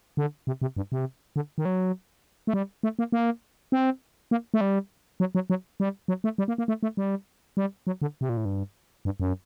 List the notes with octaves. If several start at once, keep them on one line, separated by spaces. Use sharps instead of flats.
D3
C3
C3
G2
C3
D3
D#3
F#3
A3
G3
A3
A#3
A#3
C4
A#3
A3
G3
F#3
F#3
F#3
G3
F#3
A3
G3
A#3
A#3
A3
A3
G3
G3
F#3
D3
C3
A#2
A2
G2
G2
F#2